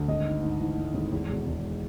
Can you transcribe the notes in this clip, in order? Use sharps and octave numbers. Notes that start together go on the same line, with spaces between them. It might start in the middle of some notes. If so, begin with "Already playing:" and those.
Already playing: D2
G#1 D#5
G#2
G#2
E3
G#2
G#1
E2
E1
E1